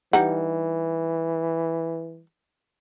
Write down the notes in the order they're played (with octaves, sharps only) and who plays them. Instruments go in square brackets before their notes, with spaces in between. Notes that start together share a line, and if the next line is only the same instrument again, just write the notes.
[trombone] E3 [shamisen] G3 D#4 F#5